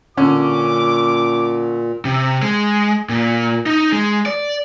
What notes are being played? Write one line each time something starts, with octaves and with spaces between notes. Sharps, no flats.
A#2 D3 C#4 D6
C3
G#3
A#2
D#4
G#3
D5